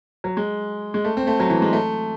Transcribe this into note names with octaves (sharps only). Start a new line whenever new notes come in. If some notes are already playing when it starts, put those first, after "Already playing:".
F#3
G#3
G#3
A3
C4
A3
F#3
E3
G#3
A3